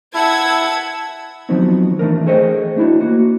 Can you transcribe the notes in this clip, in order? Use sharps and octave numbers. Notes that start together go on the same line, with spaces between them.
E4 F#5 A5 E6 G#6
D#3 F3 F#3 B3 C4 D#4
E3 A3 D4 A#4
G#4 A4 C5 C#5 D#5 G5
A3 D4 E4 F#4
A#3 F#4